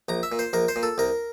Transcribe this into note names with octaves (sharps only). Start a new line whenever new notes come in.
A#1 A#5
E5
A#2
C5
A#1 A#4
C5
A#2
A4
C2 A#4